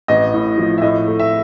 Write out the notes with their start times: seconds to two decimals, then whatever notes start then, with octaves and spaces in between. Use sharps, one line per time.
0.08 A1 D#5
0.34 A2
0.58 F3
0.78 E5
0.82 A2 D#5
1.07 A3
1.20 E5